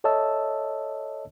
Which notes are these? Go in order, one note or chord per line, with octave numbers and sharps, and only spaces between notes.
A4 C#5 D#5 E5 A5 E6